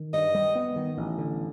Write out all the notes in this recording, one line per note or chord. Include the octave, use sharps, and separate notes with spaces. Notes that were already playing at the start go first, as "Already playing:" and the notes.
Already playing: D#3
G2 D#5
G3
B3
D#3
A1
D3